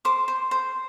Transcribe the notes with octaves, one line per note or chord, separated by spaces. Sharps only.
C5 D6
C5
C5